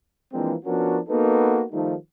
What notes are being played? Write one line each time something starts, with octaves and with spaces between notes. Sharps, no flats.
E3 F3 G#3 A#3 C4 D4
F3 B3 C#4 D4 F#4 A#4
A#3 B3 D#4 F#4 A4 B4
D#3 F3 G3 A3 D#4